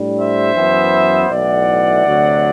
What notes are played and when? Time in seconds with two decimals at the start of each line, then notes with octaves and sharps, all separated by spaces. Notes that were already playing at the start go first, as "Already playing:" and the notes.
Already playing: A2 G3 D4
0.18 C5 E5
0.55 F#2 E3 B3
1.30 B1 A2 E3 D5 F#5
2.06 D2 C3 F#3